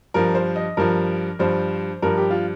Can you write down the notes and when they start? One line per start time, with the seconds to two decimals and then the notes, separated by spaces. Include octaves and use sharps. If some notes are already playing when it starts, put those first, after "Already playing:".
0.14 G2 F3 A#4
0.35 C5
0.56 D#5
0.77 G2 F3 A#4
1.39 G2 F3 C5
2.02 G2 F3 A#4
2.18 G4
2.31 F4